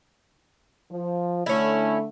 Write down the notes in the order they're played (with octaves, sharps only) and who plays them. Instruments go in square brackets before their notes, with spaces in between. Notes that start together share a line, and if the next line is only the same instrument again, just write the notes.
[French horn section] F3
[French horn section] D3 A3 [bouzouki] C#4 E4